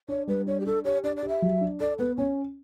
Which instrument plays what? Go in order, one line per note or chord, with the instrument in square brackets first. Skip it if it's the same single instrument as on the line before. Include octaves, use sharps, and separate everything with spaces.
[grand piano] D4 [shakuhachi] C#5
[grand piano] G3 [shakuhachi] B4
[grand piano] D4 [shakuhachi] C#5
[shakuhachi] G4
[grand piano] D4 [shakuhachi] A4
[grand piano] G4 [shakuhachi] C#5
[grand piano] D4 [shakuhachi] D5
[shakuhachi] D5
[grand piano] G4
[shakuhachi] E5
[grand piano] F#3
D4
[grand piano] A4 [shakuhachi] D5
[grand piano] B3 [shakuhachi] B4
[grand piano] C#4 [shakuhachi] C#5